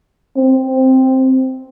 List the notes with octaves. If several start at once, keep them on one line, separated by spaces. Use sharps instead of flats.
C4